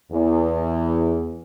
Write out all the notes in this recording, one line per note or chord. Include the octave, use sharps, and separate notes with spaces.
E2